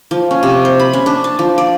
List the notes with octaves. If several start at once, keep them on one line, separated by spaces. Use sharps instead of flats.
F3
C#4
C3
C5
B5
C#4
D4
A5
F3
D5